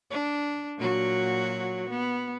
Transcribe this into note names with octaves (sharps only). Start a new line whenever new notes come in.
D4
A#2 F#3 F#4
B3